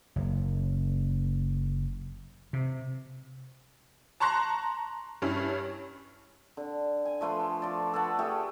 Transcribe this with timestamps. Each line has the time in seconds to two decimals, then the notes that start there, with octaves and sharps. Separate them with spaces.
0.16 F#1
2.53 C3
4.20 A5 A#5 C6 C#6 F#6 A#6
5.22 G2 C#4 E4
6.57 D3
7.05 G#5
7.21 F3 A3 B4 C6
7.62 F3 D5
7.93 A4 B4 C#5 F#5
8.19 A3 G4 G#4